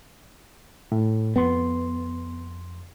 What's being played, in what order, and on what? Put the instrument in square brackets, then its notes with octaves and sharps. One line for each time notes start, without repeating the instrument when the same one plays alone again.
[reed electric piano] A2
[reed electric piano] F2 C6 [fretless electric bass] B3